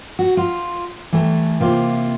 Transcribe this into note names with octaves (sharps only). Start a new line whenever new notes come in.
F#4
F4
E3 G3 A3
C3 A#3 F4